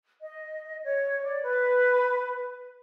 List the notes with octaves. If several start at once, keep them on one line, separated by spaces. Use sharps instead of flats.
D#5
C#5
D5
B4